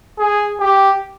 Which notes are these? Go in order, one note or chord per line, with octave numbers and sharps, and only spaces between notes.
G#4
G4